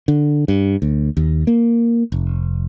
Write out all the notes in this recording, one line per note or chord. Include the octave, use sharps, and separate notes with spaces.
D3
G2
D2
D#2
A#3
F1